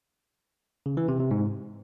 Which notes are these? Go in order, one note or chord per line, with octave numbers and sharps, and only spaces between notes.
C#3
E3
C3
C3
G#2